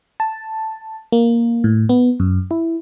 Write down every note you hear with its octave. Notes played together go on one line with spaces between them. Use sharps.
A5
A#3
A2
B3
F#2
E4